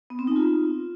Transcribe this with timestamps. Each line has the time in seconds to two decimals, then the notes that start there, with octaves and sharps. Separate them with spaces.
0.10 B3
0.19 C4
0.27 D#4
0.36 F4